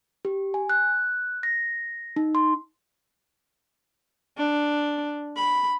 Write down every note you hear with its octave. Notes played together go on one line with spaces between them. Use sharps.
G4
G#5
F#6
A#6
D#4
C6
D4
B5